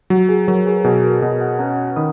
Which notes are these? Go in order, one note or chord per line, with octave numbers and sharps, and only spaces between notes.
F#3 F#4
G#4
F#3 A#4 C#5
G#4 B4
B2 G#4
F#4 A#4
B2 B4 D#5
D#5 F#5
C#4 F#5 A#5
D#3 B5 D#6